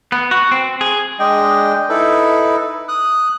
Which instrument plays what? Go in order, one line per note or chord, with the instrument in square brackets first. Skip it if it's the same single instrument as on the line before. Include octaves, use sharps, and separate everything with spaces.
[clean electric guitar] B3
F#4
C4
G#4
[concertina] G#3 D4 D#5 G5
D#4 E4 A4 B4
D#6 F#6